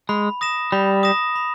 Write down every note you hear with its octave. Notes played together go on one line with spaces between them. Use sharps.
G#3 B5
D#6 A#6 E7
G3 B5
D#6 A#6 E7
B5